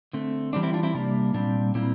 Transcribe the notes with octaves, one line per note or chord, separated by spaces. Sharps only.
D3 A3 C4
E3 G3 C4 D4
C4 E4
D4 F4
C4 E4
C3 G3 A#3 D4
A#2 G3 C4 D4
A#2 G3 A#3 C4 E4